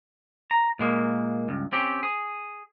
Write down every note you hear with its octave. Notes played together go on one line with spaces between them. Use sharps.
A#5
A#2 G#3 A#3
C#2 G2
C4 C#4 G4
G#4